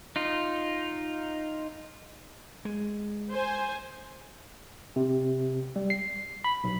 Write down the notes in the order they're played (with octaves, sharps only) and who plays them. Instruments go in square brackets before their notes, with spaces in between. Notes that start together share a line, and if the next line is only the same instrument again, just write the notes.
[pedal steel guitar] D#4 F4
[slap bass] G#3
[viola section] C5 G#5
[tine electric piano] C3
G3
C7
B5
B1